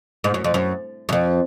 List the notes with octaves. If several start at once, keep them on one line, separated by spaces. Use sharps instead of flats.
G#2
F#2
F2
F#2
F#2
F2